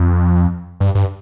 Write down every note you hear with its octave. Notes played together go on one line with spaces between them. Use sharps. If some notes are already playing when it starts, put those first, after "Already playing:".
Already playing: F2
G2
G2